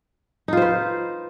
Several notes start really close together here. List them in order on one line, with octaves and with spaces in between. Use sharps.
D#4 F4 C5 B4